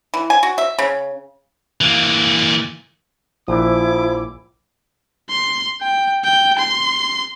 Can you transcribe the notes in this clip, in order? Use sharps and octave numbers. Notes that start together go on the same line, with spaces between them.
E3
G#5
F#4
E5
C#3
E3 A#3
A#1 F3 E4 D6
C6
G5
G5
C6